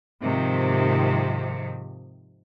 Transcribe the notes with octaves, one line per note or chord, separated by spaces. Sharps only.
G#2 C3 D#3 F3